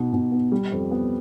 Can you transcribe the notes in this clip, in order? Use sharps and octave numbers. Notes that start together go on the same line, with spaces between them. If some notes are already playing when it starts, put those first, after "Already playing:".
Already playing: B2 D#4
B2
B3
G3
F2
B3